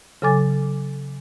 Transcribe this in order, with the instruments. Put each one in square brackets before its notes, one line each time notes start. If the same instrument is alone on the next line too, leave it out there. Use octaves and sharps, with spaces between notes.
[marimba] C#3 F#3 A4 G#5 D6 A6